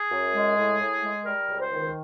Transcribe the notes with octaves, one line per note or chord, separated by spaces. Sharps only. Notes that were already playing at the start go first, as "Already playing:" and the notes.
Already playing: G#4
F#2
G#3
A2
A2
G#3
G3 A#4
C#2
C5
D#3